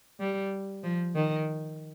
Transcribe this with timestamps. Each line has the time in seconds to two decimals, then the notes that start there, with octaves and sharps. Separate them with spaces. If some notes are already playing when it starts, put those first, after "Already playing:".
0.20 G3
0.83 F3
1.15 D#3